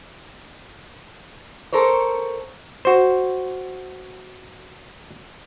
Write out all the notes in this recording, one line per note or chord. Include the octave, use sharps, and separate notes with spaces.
A4 A#4 C5 C#5
F#4 C5